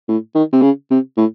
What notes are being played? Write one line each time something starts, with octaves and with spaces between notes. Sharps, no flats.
A2
D#3
C3
C#3
C3
A2